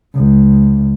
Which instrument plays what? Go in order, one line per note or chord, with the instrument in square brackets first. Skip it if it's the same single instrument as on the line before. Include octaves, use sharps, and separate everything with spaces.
[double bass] C#2